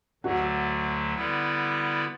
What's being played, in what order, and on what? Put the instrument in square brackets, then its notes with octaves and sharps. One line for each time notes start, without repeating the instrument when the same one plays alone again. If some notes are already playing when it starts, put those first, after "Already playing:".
[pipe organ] D2 D3 F#3 A3 [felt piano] F#4
[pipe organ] D3 G3 B3 E4 B4